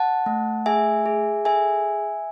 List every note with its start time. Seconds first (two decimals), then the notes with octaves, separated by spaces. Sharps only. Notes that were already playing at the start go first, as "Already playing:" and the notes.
Already playing: F#5 A5
0.26 A3
0.66 G#4 E5 G#5
1.06 G#4
1.45 A4 E5 G#5